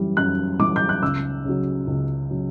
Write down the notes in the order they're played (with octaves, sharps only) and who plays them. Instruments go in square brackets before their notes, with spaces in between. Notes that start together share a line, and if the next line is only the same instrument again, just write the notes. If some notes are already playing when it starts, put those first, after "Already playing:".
Already playing: [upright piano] F#2 E3 G3
F#2 F#6
E3 G3 D6
G6
F#6
C#2 E6
C#3 F#3
C#2
C#3 F#3